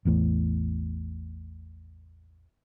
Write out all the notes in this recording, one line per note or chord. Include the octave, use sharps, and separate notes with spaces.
A1 E2 A2